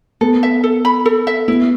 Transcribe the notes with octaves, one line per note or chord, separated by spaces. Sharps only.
B3 A4
E5
A4
B5
A4
E5
B3 E4